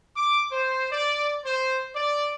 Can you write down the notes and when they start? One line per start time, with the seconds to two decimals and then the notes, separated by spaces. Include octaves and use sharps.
0.17 D6
0.52 C5
0.91 D5
1.45 C5
1.95 D5